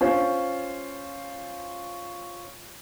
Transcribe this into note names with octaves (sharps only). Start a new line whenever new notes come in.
C#4 F4 C5